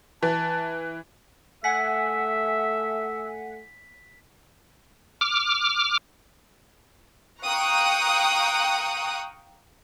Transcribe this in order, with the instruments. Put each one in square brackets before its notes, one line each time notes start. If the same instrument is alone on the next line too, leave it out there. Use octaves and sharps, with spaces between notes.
[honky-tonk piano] E3 [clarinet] A5
[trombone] A3 [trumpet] E5 [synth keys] F#5 G#5 [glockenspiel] B6
[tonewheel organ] D6 F6
[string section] F5 G5 A#5 C#6 D#6 F#6